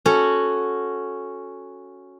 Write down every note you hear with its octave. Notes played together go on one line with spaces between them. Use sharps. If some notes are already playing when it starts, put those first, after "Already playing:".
C#4 F#4 A4